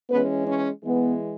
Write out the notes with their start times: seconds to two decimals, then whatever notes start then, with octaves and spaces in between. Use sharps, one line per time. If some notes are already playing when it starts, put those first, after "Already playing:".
0.10 E3 G#3 B3 C#4 B4
0.46 C#4 C#5
0.83 E3 G#3 B3